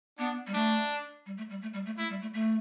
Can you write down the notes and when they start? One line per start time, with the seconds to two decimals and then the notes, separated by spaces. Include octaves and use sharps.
0.18 B3 D4
0.47 G3
0.54 A3 D4
1.26 G3
1.37 A3
1.50 G3
1.62 A3
1.73 G3
1.85 A3
1.98 A3 E4
2.09 G3
2.21 A3
2.33 A3